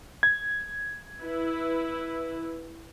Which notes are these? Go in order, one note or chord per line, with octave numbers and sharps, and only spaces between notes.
G#6
E4 B4